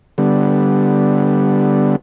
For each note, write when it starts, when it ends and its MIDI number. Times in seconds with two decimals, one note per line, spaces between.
0.18 1.96 50
0.18 1.96 55
0.18 1.96 59